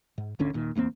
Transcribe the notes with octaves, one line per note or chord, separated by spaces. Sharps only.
G#2
G#1 D2 D3 C#4
D#1 A#2 D#3
D1 E2 A#3 C4